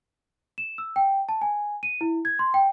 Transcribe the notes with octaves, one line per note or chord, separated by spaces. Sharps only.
E7
E6
G5
A5
G#5
D#7
E4
G#6
C6
G5